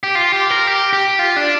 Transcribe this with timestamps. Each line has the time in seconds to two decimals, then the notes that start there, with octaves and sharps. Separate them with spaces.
0.03 G4
0.15 F4
0.33 G4
0.50 A#4
0.67 G4
0.93 G4
1.19 F4
1.36 D4